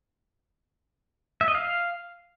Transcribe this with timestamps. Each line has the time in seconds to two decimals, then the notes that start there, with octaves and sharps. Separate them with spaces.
1.41 E5
1.48 D#5
1.55 F5